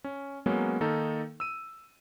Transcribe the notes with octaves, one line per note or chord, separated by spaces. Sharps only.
C#4
F#3 G#3 A#3 B3 C#4
D#3 A#3 D#4 A4
E6 D#7